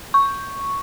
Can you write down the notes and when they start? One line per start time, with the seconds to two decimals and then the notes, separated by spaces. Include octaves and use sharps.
0.14 C#6